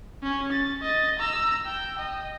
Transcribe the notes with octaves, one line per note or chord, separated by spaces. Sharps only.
C#4
A6
D#5 A6
A#5 E6
G5
D#5